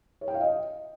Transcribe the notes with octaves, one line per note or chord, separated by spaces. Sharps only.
C#5
G5
F5
D#5